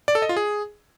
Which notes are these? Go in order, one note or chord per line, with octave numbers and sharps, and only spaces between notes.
D5
A4
D#5
F4
G#4